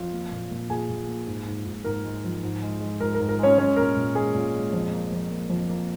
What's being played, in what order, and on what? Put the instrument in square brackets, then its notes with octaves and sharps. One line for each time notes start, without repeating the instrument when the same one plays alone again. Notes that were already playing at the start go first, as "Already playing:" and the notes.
Already playing: [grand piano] F2 F4 F5
A#3
A#2
A#2
A#2 G#4 G#5
A#2
A#3
G#2
G#2
G#2
G#2 A#4
G#3
F3
G#2
G#3
G#3
G#2 A#4
A#4
G#2
A#4
G#3 C#4 C#5
G#3 C#4 C#5
A#2 A#4
A#2
G#3 G#4
A#2
G#3
F2
A#3
F2
A#3
F2
A#3